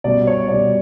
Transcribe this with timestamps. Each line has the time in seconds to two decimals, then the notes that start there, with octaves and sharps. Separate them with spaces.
0.04 B2 G3 D5
0.27 C#5
0.48 B2 G3 D5